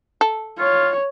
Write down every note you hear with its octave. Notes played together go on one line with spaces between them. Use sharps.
A4
F4 C#5